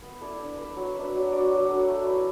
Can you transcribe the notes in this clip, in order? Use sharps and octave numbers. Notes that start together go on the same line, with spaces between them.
B3
E4 A4 D5
D4
B4 E5
F#3
D4 B4 E5
F#3
D4 F#4 D5
F#3
D4 A4
A3
E4 B4